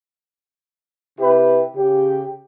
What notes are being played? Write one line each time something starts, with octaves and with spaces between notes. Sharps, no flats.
C3 E4 G4 B4
C#3 G4